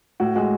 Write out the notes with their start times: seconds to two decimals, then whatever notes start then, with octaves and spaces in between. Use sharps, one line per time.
0.20 A2 F#4
0.35 G#3 F#4